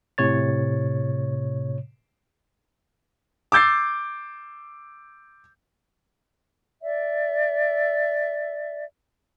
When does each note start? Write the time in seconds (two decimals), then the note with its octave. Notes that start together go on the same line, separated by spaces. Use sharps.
0.18 A2 C3 C#5 A6
3.52 D6 E6 G6 A6 C7
6.81 D5 E5